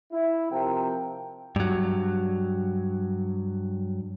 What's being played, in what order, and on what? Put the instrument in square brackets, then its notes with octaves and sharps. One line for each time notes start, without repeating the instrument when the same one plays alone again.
[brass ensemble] E4
C3 F3 A#4 G5
[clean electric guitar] G2 F#3